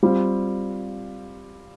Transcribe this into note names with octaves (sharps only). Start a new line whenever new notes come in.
G3 C4 F4